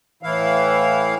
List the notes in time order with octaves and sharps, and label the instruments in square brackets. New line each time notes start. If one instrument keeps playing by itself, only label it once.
[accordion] A2 E3 E4 F5